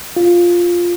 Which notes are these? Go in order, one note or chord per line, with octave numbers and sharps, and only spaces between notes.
F4